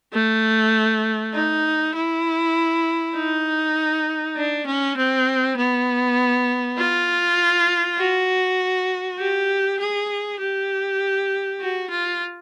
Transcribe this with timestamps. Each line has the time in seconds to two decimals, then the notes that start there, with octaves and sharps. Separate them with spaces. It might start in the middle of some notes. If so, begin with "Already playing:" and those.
0.13 A3
1.34 D#4
1.95 E4
3.15 D#4
4.36 D4
4.67 C#4
4.97 C4
5.57 B3
6.78 F4
7.98 F#4
9.18 G4
9.80 G#4
10.40 G4
11.61 F#4
11.90 F4